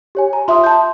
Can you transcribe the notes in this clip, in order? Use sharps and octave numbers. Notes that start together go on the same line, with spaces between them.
G4 C#5 G#5
A#5
F4 E5 C6 D#6
A5 G6